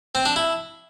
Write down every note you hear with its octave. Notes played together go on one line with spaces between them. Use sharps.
C4
D4
E4